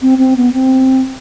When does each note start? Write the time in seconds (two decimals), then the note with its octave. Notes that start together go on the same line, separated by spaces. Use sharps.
0.02 C4
0.18 C4
0.37 B3
0.53 C4